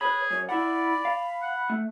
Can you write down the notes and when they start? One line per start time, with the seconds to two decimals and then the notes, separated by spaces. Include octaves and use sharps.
0.01 G#4 B4 C#5 B5
0.31 F#2 C#5
0.49 E4 D5 F#5 B5
1.05 F5
1.42 F#5
1.70 A3